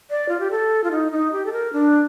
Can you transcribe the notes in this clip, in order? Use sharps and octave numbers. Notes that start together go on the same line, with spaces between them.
D5
F4
G4
A4
F4
D#4
D#4
G4
A4
A#4
D4